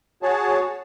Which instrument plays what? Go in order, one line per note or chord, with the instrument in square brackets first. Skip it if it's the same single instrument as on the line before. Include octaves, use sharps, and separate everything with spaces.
[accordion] F#4 G#4 C#5 A5